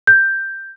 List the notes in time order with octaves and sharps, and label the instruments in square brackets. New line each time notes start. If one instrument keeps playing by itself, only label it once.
[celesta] G6